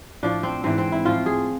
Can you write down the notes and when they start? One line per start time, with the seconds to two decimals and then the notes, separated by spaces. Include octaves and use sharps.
0.23 A2 F3 D4
0.43 C4
0.64 G#2 E3 C4
0.78 C4
0.92 E4
1.05 A2 F3 F4
1.26 G#4